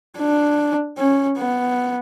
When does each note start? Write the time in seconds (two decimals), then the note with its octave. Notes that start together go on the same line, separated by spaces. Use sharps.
0.18 D4
0.98 C#4
1.38 B3